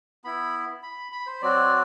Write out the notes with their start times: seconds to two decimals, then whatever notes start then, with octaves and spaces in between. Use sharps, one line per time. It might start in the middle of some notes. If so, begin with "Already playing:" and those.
0.24 B3 E4 B5
0.83 B5
1.12 B5
1.27 C5
1.42 F#3 C4 F#4 D5